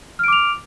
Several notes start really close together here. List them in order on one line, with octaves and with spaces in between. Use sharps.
F6 D7 D6 F7